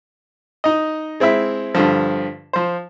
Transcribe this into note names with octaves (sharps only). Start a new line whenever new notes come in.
D#4 D#5
G#3 C4 E4 E5
G2 D3 F3
F3 C5